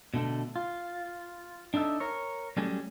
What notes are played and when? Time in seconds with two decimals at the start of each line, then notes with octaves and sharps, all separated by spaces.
0.14 B2 D3 A3
0.56 F4
1.74 D4 D#4 A4 E5
2.00 A#4 C#5
2.57 F#3 G3 A3 C#4 G#4